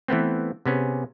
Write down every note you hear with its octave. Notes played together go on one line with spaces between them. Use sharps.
E3 A3 B3 C4
C3 B3 C#4 G#4